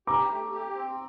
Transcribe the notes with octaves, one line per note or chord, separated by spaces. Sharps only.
G4 A#5 D6
A3
G4
C4